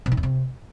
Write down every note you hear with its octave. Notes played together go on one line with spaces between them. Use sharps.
B2
D#3
E2
C3